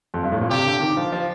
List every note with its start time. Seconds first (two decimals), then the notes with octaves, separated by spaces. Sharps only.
0.14 F2
0.23 G2
0.32 A2
0.41 A#2
0.50 C3 G4
0.65 D3
0.81 D#3
0.97 F3
1.12 F3